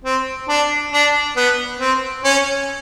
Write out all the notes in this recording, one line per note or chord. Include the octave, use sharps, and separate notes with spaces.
C4
D4
D4
B3
C4
C#4